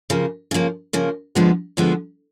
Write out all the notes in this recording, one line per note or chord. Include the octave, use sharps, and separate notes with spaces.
C#3 F3 A#3
C#3 F3 A#3
C#3 F3 A#3
D2 D3 F3 G#3 B3
D2 D3 F3 G#3 B3